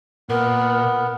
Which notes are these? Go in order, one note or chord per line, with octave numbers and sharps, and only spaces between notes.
A#2 B3 A#4